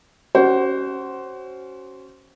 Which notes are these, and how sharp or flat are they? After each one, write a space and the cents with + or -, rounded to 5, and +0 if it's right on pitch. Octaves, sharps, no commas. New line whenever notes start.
C#4 +0 F#4 +25 C5 +0